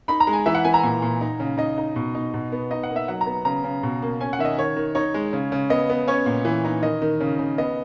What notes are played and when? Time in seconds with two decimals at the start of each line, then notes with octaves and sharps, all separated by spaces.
0.08 D#4 B5
0.20 A#5
0.27 G#3
0.33 G#5
0.46 E3 E5
0.55 F#5
0.64 E3 G#5
0.74 A#5
0.83 A#2
1.02 A#2
1.21 D#4
1.40 C#3
1.58 D#4 D#5
1.78 D#4
1.96 B2
2.15 D#4
2.34 B2
2.52 B3
2.71 D#4 D#5
2.83 F#5
2.90 A#3
2.96 E5
3.08 F#3 F#5
3.21 A#5
3.26 B3
3.45 C#3 A#5
3.64 C#3
3.83 B2
4.02 A#3
4.21 C#4 G#5
4.33 F#5
4.39 D#3 E5
4.45 D#5
4.58 D#3 C#5
4.76 D#3
4.95 D#4 C#5
5.14 G#3
5.33 C#3
5.52 C#3
5.70 B3 D#5
5.90 B3
6.07 C#4 C#5
6.26 A#2
6.45 E3
6.64 D#4
6.82 D#3 D#5
7.02 D#3
7.20 C#3
7.39 C#3
7.58 B3 D#5